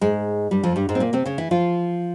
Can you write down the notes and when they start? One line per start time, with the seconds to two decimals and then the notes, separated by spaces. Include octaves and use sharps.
0.01 G#2 G#3
0.51 G2 G3
0.63 F2 F3
0.76 G2 G3
0.89 G#2 G#3
0.95 C4
1.00 A#2 A#3
1.13 C3 C4
1.26 C#3 C#4
1.38 E3 E4
1.51 F3 F4